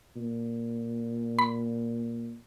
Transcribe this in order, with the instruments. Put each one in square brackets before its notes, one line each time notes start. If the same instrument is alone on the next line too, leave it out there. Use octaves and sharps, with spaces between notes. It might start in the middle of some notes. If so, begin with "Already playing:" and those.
[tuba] A#2
[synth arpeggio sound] B5